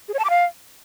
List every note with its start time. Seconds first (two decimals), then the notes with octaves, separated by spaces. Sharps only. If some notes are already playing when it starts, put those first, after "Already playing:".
0.08 G#4
0.14 C#5
0.19 A5
0.24 D6
0.30 F5